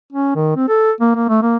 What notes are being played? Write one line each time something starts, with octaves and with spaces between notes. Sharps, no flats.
C#4
D#3
C4
A4
A#3
A#3
A3
A#3